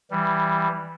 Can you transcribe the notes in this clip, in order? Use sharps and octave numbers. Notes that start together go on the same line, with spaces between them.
E3 G3